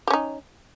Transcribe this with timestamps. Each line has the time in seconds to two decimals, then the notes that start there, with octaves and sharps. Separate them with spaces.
0.07 G4
0.10 C#4
0.13 D#4